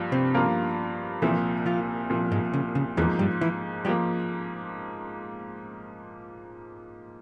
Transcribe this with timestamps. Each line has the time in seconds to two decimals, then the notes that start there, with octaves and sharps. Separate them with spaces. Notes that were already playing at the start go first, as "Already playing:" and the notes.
Already playing: G2 F3 A#3 F4
0.12 C3 C4
0.34 G2 F3 A#3 F4 A#4
1.22 C2 A#2 E3 F3 E4
1.66 F3 F4
2.10 C2 A#2 F3
2.32 G#2 G#3
2.53 C#3
2.75 C#3
2.97 E2 G#2 E3 F3 A#3
3.19 G2 G3
3.41 E3 E4
3.85 F3 G3 A#3 G4